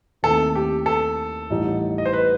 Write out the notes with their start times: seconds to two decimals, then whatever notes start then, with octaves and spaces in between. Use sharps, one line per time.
0.23 D#2 D#3 A3 C4 E4 A4
0.55 G4
0.86 A4
1.50 A1 A2 G3 D#4
1.98 D#5
2.06 C5
2.13 B4